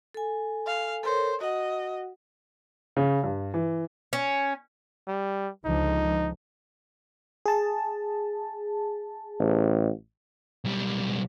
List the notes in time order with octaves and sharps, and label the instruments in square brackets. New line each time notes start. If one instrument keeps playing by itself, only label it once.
[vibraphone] A4 G#5
[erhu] F5
[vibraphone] A4 A#4 C#5 [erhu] C5
[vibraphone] F#4 F#5 [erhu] D#5
[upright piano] C#3
G2
E3
[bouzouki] C#4
[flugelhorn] G3
[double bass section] C#2 D3 F3 [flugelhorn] D#4
[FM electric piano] G#4 A5
[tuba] A1
[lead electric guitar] B1 G3